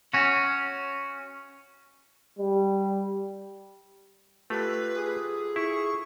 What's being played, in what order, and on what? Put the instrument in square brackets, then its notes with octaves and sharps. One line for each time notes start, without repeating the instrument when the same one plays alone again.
[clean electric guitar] C#4 F#4
[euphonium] G3
[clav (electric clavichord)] A3 [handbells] F4 G4 A4 [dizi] B4
[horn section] G#4
[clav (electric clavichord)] E4 [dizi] C#6